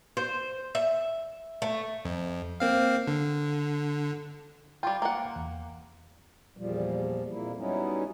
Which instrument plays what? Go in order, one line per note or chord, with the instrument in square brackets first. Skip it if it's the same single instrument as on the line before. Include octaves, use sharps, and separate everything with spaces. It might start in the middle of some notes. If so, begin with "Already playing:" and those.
[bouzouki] C5
E5
A3
[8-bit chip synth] F2
A#3 C4 F5
D3
[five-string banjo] G3 F4 [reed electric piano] G5 C6 D6
[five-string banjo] A#3 F#5
[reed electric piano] E2
[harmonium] E2 A#2 F3 G3
F2 A#2 A#3 E4
F#3 G3 B3 C#4 D#4 E4